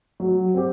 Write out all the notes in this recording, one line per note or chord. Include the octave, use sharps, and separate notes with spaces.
F#3
C4 G4